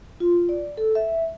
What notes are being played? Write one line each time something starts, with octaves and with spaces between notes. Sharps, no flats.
F4
D5
A4
E5